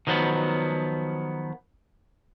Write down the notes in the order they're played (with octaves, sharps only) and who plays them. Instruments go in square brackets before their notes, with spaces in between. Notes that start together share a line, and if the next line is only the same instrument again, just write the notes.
[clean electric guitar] D#3 F3 F#3 B3